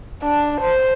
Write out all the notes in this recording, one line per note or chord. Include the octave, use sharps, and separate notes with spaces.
D4
C5